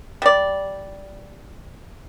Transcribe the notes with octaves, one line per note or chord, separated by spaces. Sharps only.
G3 D5